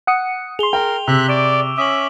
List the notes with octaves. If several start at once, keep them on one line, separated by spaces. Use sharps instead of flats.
F#5 D#6 C#7
G#4 C6 F7 G7
A#4 G5
C3 E5 E6 F#6
D5 C#6 D6 D7
C#4 E5 D6 D#6 F#7